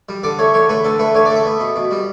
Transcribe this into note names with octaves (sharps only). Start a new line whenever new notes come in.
G3
D3 D5
A3 C#5
D3 C#5
A3 B4
D3 A4
A3 B4
D3 C#5
D5
A3
E5
B3
B2
B2
G3